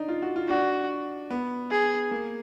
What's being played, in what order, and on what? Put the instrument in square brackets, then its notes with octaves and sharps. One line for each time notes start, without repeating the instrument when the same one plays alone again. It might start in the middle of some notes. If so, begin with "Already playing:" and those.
Already playing: [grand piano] D4 D#4
F4
F#4
F4
[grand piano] D4 [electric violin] F#4
[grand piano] B3
[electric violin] G#4
[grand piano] A#3